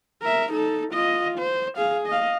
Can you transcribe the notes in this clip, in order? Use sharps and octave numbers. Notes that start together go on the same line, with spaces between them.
A#4 E5
D#4 A4
F4 D#5
C5
G#4 F5
D#5 F5